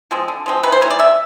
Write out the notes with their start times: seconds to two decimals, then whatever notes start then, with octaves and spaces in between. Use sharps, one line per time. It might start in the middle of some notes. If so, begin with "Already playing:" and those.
0.11 F3 G#3 C4
0.28 D3
0.46 F3 G#3 C4
0.63 C3 B4
0.72 C5
0.81 E3 G3 A#3 C#5
0.90 D5
0.99 C3 E5